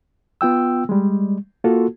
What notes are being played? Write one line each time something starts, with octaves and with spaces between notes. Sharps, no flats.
B3 F4 G5 E6
G3 G#3
A#3 F4 F#4 A4